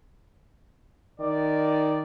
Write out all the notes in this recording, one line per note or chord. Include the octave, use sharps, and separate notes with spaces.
D#3 D5